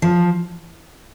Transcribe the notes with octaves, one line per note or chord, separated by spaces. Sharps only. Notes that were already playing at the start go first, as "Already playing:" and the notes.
F3